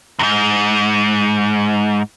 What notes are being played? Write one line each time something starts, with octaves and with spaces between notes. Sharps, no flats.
E2 G#2